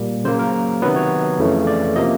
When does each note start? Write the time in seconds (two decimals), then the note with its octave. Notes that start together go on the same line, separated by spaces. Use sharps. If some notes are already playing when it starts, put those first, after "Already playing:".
Already playing: A#2 G3 A#3
0.24 C#3 F#3 A#3 C5
0.39 A#4
0.82 C3 D#3 F#3 B3 B4
0.96 C#5
1.39 F2 C#3 E3 A3
1.67 D5
1.96 C3 F3 A#3 D#5